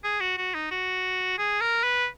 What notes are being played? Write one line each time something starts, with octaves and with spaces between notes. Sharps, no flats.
G#4
F#4
F#4
D#4
F#4
G#4
A#4
B4